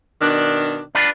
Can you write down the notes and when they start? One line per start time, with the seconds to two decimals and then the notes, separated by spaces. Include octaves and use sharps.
0.22 B2 D#3 D4
0.95 D4 F4 B4